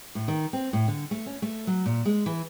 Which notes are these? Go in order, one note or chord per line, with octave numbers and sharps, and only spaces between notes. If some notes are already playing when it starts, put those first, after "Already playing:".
A2
D#3
C4
A2
D3
A3
C#4
A3
F#3
A#2
G#3
E3